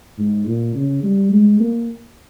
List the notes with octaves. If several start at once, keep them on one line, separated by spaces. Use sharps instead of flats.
G#2
A#2
C#3
G3
G#3
A#3